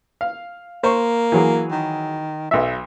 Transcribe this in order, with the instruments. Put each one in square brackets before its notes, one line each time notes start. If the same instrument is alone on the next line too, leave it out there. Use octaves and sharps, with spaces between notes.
[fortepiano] F5
[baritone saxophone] A#3 [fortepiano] C5 C#6
[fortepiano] E3 F#3 G#4
[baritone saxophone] D#3
[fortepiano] B1 E5 [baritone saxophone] F#3